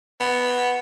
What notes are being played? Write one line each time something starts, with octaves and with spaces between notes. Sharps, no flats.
B3